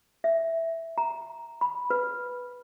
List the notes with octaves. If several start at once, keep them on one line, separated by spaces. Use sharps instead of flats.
E5
A#5
B5
B4